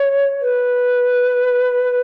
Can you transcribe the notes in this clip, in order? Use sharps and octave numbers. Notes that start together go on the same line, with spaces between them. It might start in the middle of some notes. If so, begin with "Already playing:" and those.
Already playing: C#5
B4